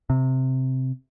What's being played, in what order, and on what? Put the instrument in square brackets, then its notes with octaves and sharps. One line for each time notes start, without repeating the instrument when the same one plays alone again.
[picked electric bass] C3